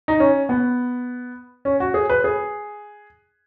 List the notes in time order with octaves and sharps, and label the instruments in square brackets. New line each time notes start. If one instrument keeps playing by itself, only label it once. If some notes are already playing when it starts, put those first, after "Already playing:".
[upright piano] D#4
C#4
B3
C#4
F#4
G#4
B4
G#4